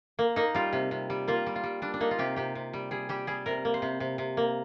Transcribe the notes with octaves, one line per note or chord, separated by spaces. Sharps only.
A#3
A#3 D#4
G3 F4
C3
C3
G3
A#3 F4
G3
F4
G3
G3 D4
D4
A#3 D#4
F4
C3 G4
C3 G4
C3
G3
G3 G#4
G3 G4
G3 G#4
C3 A#4
A#3
C5
C3
C3
C3
A#3